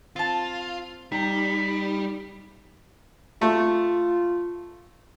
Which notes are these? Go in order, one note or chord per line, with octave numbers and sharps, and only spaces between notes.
C4 F4 A5
G3 D#4 B6
A3 F4